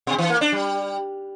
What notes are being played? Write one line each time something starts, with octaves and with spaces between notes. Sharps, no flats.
B2
E3
A#3
D4
G3